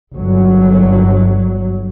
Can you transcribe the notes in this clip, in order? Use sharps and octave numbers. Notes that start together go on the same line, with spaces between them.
G1 F#3